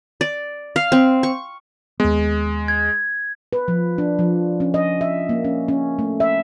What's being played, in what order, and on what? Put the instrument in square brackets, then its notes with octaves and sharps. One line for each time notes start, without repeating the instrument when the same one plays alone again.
[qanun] D5
F5
C4
C#6
[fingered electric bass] D#2 B3 [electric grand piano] G#3
[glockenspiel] G#6
[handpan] B4
F3
D4
F3
C#4
D#5
E5
A#3
C#4
C#4
A3
E5